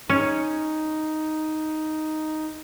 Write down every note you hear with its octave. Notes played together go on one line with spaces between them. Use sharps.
C#4 D#4